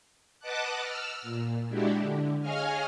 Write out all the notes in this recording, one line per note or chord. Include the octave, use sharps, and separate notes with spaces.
B4 D#5 F#5 A5 D6 F#6
E6 F6
A#2
G#3 D4 E4 F#4 G4
D3
G#4 C#5 D#5 F5 G#5 F6